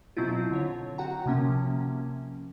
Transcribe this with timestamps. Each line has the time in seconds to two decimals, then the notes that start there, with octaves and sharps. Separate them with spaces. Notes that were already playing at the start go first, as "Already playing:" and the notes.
0.17 B2 F#3 C4 E4 F4
0.51 D3 C#5
0.98 F#4 F#5 G5 A#5
1.26 C3 F3 A#3 C#4